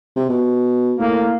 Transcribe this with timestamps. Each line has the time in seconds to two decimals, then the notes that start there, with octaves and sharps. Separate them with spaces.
0.16 C3
0.29 B2
0.99 A2 A#3